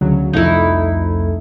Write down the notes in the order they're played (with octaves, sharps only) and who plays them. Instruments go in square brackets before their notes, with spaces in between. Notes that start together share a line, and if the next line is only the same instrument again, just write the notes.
[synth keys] D2 C#3 F#3
[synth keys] C2 F2 A3 [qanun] D#4 E4